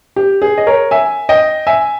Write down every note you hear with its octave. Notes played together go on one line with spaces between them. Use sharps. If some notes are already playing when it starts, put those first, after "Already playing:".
G4
G#4
D#5
A#4 C#5
E5 G#5
D#5 G5
E5 G#5